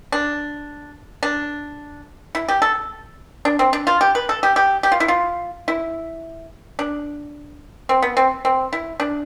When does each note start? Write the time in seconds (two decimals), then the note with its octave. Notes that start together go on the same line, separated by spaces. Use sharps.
0.12 D4
1.23 D4
2.35 E4
2.48 G4
2.62 A4
3.45 D4
3.59 C4
3.73 D4
3.87 F4
4.01 G4
4.15 B4
4.29 A4
4.43 G4
4.56 G4
4.83 G4
4.92 F4
5.00 E4
5.08 F4
5.68 E4
6.79 D4
7.89 C4
8.02 B3
8.17 C4
8.45 C4
8.73 E4
9.00 D4